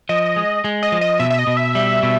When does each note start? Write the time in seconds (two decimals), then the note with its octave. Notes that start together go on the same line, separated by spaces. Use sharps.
0.09 F3 D#5
0.36 G#3
0.64 G#3
0.83 D#5
0.92 F3
1.01 D#5
1.20 B2 E5
1.31 E5
1.39 D#5
1.47 B2
1.57 E5
1.75 G3
2.03 B2